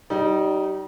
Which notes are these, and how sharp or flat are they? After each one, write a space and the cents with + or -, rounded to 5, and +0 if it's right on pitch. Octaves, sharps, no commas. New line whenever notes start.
G3 -30 D#4 +0